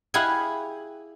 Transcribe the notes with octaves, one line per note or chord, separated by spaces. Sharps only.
E4 G4 G#4 F5 F#5 G#5